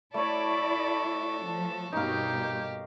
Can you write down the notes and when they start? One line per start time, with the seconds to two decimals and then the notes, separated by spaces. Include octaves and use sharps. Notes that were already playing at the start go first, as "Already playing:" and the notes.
0.14 A3 E4 F#4 A4 C#5 D5 B5
1.46 F3 A5
1.93 G2 B2 A#3 D#4 G4 F5 G6